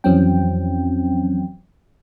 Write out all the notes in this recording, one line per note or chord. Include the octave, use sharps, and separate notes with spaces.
F2 E3 F#3 C4 C#4 G5